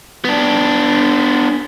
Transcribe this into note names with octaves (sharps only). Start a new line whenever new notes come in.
B3 D4